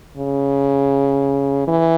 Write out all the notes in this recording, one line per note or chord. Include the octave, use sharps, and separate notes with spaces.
C#3
E3